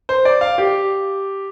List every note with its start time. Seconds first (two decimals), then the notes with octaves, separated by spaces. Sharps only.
0.09 C5
0.25 D5
0.41 F5
0.58 G4